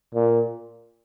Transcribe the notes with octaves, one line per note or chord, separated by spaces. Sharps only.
A#2